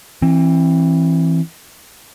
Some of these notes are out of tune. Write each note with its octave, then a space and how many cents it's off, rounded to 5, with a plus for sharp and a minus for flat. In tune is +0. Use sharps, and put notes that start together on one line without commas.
E3 +5 C4 +30